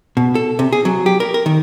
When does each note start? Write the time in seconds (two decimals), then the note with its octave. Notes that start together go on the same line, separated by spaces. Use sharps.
0.17 B2
0.35 A4
0.59 C3
0.73 G#4
0.85 F#3
1.06 G4
1.20 A#4
1.34 A#4
1.46 D#3